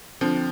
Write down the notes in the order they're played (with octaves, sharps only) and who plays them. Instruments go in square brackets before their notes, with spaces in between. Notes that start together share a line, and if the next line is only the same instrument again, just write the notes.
[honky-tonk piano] D3 F3 [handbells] C4